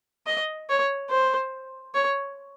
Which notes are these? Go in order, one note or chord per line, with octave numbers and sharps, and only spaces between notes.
D#5
C#5
C5
C#5